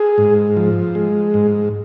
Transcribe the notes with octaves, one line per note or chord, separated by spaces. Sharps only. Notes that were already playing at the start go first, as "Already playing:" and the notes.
Already playing: G#4
G#2
F3
G#3
G#2